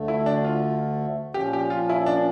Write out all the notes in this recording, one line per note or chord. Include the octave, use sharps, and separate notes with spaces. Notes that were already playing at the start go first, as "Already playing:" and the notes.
Already playing: D2 D3 A3
E4
D4
F4
A#2 F3 C#4 G4
G4
F4
E4
D4